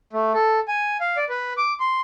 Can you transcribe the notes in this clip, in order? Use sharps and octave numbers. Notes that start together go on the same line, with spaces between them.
A3
A4
G#5
F5
D5
B4
D6
C6